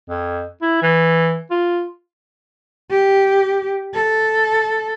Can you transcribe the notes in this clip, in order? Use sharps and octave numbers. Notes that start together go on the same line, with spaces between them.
F2
E4
E3
F4
G4
A4